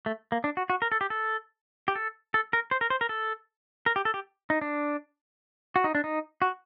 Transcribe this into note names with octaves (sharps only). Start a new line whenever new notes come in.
A3
A#3
D4
F#4
F#4
A#4
A4
G4
A4
G4
A4
A4
A#4
C5
A#4
C5
A#4
A4
A#4
G4
A4
G4
D#4
D4
F#4
D#4
D4
D#4
F#4